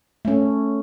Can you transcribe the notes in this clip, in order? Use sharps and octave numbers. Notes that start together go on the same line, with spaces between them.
A3 C#4